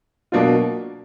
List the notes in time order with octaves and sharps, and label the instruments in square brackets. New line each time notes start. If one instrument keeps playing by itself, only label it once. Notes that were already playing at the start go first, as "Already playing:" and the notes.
[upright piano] B2 F#3 A#3 D4 F4